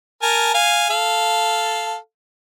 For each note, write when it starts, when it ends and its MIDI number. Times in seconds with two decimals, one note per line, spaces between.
0.22 0.52 70
0.22 0.52 80
0.22 0.52 81
0.54 0.89 77
0.54 0.89 80
0.90 1.96 69
0.90 1.96 77